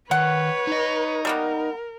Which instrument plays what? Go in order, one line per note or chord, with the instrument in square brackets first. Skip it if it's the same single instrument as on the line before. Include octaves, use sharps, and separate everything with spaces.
[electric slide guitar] D#3 [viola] B4 C#5 [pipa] F#5
[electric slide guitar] D#4 D#5
[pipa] G3 A#3 B3 [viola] A#4